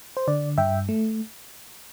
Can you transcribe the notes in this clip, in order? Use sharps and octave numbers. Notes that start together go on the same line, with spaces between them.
C5
D3 D5
G2 E5 G5
A3